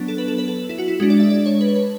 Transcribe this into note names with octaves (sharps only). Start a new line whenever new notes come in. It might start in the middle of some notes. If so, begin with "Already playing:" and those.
Already playing: F#3 B3 D4
A4
B4
A4
B4
A4
E4
F#4
E4
G#3 D4 F#4
D5
E5
D5
C#5
B4
C#5
B4